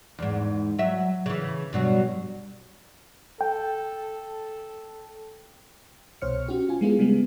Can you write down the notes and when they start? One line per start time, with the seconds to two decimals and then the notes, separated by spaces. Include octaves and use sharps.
0.19 E2 G#2
0.79 F#3 E5
1.26 C#3 E3
1.73 G2 B2 F#3
3.41 A4 G5
6.22 C2 B2 C5 C#5 F6 C#7
6.48 C#4 F#4 G4
6.68 F4 G#5
6.81 G#3 A3 B3 E4 F4 G#4
6.99 C#3 G3 G#3 B3